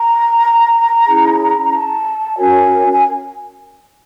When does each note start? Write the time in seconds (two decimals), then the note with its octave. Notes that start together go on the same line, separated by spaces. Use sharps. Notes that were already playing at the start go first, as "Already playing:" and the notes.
Already playing: A#5
1.08 C#4 E4 G#4
1.73 A5
2.37 C#4 F#4 A#4 C#5 G#5
2.92 G#5